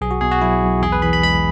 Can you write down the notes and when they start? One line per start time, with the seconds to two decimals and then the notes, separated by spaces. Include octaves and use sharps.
0.01 B1 G#4
0.11 F#4
0.21 B2 G#4
0.31 F#4
0.41 F#3 E4
0.62 B1
0.82 E2 G#4
0.92 B4
1.02 E3 B5
1.13 B5
1.23 G#3 B5